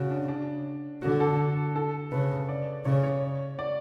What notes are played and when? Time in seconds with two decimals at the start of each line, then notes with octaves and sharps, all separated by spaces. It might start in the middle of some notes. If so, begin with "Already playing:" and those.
Already playing: C#3 F#4
0.10 D4
0.28 D4
1.02 D3 F#4
1.20 A4
1.76 A4
2.12 C#3 B4
2.49 D5
2.85 C#3 C#5
3.03 C#5
3.59 D5